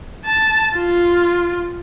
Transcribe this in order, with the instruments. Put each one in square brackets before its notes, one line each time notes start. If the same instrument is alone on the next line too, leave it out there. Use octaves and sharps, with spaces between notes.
[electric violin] A5
F4